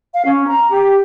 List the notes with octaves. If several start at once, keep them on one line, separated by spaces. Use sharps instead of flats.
F5
C#4
A#5
G4